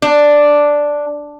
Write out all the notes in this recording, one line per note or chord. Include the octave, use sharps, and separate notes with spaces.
D4